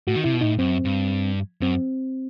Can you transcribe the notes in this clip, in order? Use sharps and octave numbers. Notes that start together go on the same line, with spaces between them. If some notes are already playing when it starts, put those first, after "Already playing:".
A2 F#4
D#3
C3 E4
B2
A2 D#4
F#2 C4
G2
F#2 C4